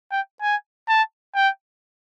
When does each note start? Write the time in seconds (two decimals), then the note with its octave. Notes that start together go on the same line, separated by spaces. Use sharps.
0.11 G5
0.42 G#5
0.89 A5
1.35 G5